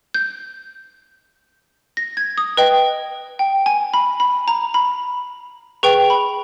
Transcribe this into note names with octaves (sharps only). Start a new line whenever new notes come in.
G6
A#6
G#6
D#6
B4 D#5 G5
G5
G#5
B5
B5
A#5
B5
G#4 B4 G5 C#6
B5